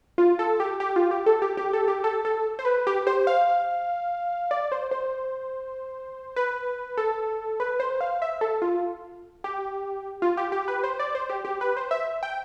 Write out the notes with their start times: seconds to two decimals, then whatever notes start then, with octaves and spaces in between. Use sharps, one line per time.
0.18 F4
0.39 A4
0.60 G4
0.80 G4
0.96 F4
1.11 G4
1.26 A4
1.42 G4
1.57 G4
1.73 A4
1.88 G4
2.04 A4
2.25 A4
2.59 C5
2.65 B4
2.87 G4
3.07 C5
3.27 F5
4.51 D5
4.72 C5
4.91 C5
6.36 B4
6.97 A4
7.60 B4
7.80 C5
8.01 F5
8.22 E5
8.41 A4
8.62 F4
9.44 G4
10.22 F4
10.37 G4
10.52 G4
10.68 B4
10.84 C5
10.99 D5
11.15 C5
11.30 G4
11.45 G4
11.61 B4
11.77 C5
11.91 E5
12.23 G5